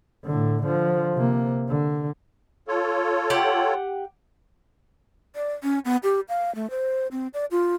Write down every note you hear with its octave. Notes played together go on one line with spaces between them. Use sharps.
A2 D3
D3 F3
C3 A#3
D3
F4 A4 C#5
G4 F#5
D5
C#4
B3
G4
F5
A3
C5
C4
D5
F4